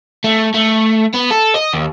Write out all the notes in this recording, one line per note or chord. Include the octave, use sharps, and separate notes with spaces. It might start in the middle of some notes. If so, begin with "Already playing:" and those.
A3
A3
B3
A4
D#5
D#2